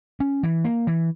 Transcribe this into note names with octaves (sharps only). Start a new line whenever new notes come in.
C#4
E3
A#3
E3